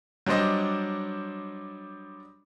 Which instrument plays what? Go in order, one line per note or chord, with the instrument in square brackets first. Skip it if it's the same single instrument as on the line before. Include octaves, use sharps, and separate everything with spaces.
[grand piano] F#3 G3 D4 C5 D#5